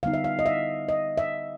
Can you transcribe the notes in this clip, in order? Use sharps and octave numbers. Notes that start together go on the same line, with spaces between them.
D3 G3 B3 D#4 F5
E5
F5
D#5
E5
D#5
E5